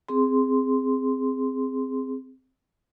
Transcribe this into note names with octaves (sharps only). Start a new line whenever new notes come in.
C4 G#4 C6